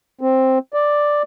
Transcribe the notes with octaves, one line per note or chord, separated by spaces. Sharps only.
C4
D5